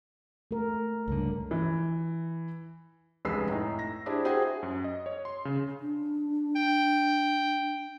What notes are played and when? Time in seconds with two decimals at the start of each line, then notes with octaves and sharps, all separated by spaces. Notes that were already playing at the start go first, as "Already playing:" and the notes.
0.51 A3 A#4
1.08 C#2 G2 D3
1.51 E3
3.25 F1 C#2 G#3 B4 E6 C7
3.50 A2 D#4
3.79 A#6
4.06 D4 E4 G4 G#4 C5
4.25 F#4 G#4 C5 E5 F#5 G5
4.63 F#2
4.84 D#5
5.06 C#5
5.25 C6
5.45 C#3
5.80 D4
6.56 G5